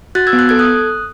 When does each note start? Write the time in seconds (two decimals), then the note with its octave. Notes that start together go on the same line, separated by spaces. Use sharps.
0.15 F#4 F#6 A6
0.27 E6 G#6
0.33 B3
0.39 F#6
0.49 A4 G#6
0.59 D#6 F#6